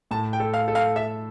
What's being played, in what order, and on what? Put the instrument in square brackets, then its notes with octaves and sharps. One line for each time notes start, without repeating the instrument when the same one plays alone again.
[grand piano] A2 [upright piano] A5
[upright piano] G5
[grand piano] A4
[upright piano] F5
[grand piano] A4
[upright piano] F5
[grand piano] A4 [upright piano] E5